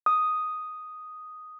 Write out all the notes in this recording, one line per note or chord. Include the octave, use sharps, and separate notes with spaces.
D#6